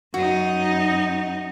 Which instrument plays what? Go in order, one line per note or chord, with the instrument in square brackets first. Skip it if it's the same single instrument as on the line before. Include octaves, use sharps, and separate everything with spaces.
[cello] F#2 D#4 [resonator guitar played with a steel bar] F#4